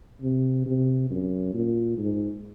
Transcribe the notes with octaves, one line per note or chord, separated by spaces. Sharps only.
C3
C3
F#2
A#2
G#2